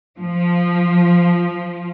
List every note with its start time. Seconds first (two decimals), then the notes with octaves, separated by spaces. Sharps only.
0.19 F3